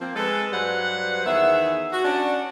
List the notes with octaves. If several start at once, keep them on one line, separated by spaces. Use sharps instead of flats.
F3 A#3 C4
G#3 A4 B4
G2 F#3 G3 B4 C5 F#5
E2 D#3 B3 G#4 E5
F#4
C#4 D4 F#4